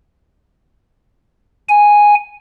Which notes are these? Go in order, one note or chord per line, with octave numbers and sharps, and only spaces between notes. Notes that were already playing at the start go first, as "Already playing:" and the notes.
G#5